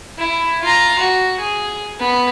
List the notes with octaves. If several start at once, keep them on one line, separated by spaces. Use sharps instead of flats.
E4
F4 A#5
F#4
G#4
B3